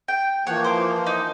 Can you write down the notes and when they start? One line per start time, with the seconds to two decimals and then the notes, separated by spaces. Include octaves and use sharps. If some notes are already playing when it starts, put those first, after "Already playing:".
0.08 G5
0.47 E3 F3 A#3 C#5 F#5
0.64 C5 D6
1.07 D#4